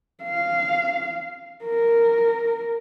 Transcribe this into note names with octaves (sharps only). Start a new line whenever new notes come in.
F5
A#4